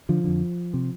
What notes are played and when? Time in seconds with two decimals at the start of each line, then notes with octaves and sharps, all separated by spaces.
0.09 D3 F3
0.24 F2 D3
0.74 C3